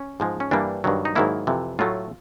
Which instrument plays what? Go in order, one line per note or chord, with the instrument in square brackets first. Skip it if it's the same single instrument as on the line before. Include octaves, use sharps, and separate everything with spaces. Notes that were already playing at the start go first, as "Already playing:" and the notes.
Already playing: [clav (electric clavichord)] C#4
G#2 F3 G#3
C#4
G2 E3 G3 A#3 D4
G2 D#3 F#3
D#4
G#2 D#3 F#3 A#3 E4
F2 C3 E3
A2 F#3 A3 F4